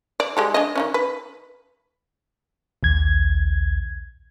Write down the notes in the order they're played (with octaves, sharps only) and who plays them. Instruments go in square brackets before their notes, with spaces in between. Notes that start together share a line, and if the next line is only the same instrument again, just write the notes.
[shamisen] D5
G#3 G4 A4
D4 G#4 D#5
D#3 G#3 C#4
B4
[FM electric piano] A#1 D#2 G#6